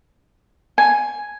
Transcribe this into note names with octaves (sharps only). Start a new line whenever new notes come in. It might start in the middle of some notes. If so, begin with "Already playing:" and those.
G#5